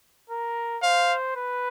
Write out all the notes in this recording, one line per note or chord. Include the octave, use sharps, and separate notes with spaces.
A#4
C5 F5
B4